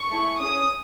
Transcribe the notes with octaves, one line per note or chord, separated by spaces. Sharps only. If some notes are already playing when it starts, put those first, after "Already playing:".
Already playing: C#6
A3 E4 G#4
C#4 G#4 D#6